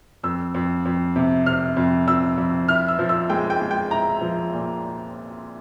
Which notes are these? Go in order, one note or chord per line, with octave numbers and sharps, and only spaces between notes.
F2 E6
F2
F2
C3
C3 F6
F2
F2 E6
F2
E4 F6
E6
F3
E6
G#3 G5
G5
G#3
G5
E4 A#5
F3
A#2